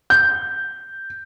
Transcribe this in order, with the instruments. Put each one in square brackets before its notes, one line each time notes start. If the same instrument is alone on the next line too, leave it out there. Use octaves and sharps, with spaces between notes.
[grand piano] G6